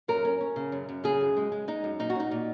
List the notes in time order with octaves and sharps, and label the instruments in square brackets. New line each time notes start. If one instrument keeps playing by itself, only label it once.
[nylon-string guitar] F#2 A#4
C#4
C#4
C#3
F#2
F#2
C#3 G#4
F#2
G#3
G#3
G#3 D#4
F#2
A#2 D#4
F#4
C#4
D#4
A#2